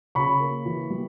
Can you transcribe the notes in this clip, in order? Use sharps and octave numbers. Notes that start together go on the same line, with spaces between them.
C#3 B5 C#6
A#3
E3
G3